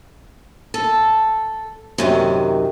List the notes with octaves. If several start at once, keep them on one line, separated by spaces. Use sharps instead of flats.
A4
F#2 C3 D#3